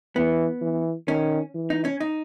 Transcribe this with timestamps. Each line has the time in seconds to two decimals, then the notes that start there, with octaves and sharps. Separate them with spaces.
0.16 E3 B3
0.61 E3
1.07 D#3 C#4
1.54 E3
1.70 D#4
1.85 C#4
2.00 D#4